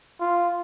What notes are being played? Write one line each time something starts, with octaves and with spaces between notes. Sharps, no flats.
F4